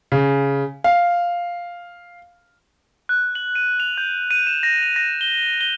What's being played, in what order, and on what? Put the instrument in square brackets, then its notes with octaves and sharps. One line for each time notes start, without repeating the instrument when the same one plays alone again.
[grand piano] C#3
F5
[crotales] F#6
F#7
D#7
F7
G6
D#7
E7
A#6
F7
A#6
G7
G7